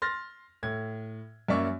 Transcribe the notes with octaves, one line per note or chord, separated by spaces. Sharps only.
C6 F6 A6 A#6
A2 G#6
F#2 A#3 C#4 D5 E5 C#6